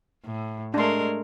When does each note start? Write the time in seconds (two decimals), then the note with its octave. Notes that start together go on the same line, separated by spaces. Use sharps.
0.25 A2
0.74 G#3 A3 D4 A#4 C6